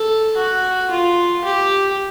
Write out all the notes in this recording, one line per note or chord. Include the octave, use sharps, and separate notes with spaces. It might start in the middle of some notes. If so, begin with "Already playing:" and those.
Already playing: A4
F#4
F4
G4